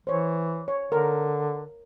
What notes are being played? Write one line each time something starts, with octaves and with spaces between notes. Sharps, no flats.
E3 C5 C#5
C#5
D3 A#4